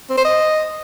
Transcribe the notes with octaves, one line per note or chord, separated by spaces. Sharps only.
C4
C5
D#5